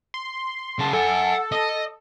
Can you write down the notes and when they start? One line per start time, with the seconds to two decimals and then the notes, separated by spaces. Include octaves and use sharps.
0.14 C6
0.79 C#3 A5
0.93 A4 F#5 G#5
1.52 D#5